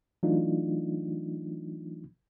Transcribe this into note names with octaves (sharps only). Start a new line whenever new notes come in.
E3 F#3 A3 D4 D#4 F4